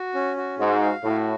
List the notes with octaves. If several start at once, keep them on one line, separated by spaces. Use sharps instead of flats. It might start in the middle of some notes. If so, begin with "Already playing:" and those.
Already playing: F#4
C#4
F#4
G#2 F#4
F5
A2 F#4